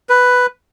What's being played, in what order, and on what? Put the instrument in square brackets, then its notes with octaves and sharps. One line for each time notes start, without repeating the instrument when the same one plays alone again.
[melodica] B4